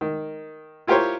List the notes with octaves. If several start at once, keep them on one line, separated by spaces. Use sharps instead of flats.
D#3
E4 F4 G4 A#4 C5 C#5